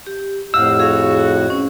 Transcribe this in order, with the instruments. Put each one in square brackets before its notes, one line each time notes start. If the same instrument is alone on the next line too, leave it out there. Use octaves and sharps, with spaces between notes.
[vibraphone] G4
[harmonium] F2 A2 [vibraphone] G4 F#5 [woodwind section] D#5 F5 [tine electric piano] E6
[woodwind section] F#4 [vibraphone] G#4 F5
[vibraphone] C#4